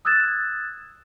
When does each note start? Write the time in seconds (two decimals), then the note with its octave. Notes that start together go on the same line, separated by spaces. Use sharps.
0.05 D#6 E6 F#6 G#6 A6 E7